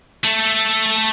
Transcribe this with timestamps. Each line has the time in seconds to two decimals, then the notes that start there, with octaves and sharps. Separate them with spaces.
0.24 A3 A4